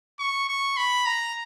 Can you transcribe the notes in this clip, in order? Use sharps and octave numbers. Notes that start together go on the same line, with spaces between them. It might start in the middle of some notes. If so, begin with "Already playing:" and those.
C#6
C#6
B5
A#5